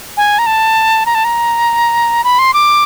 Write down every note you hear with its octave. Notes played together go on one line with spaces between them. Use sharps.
G#5
A#5
A5
A#5
A5
A#5
B5
C6
D6